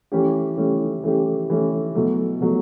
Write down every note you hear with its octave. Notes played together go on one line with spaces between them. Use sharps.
E3 A3 C#4 G4
E3 A3 C#4 G4
E3 A3 C#4 G4
E3 A3 C#4 G4
B2 F#3 A3
B2 F#3 A3